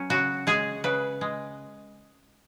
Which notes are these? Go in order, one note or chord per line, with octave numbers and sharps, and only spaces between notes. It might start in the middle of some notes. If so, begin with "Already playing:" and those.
Already playing: F#3 C#4
C#3 F#4
G#3 G#4
C#3 B4
G#3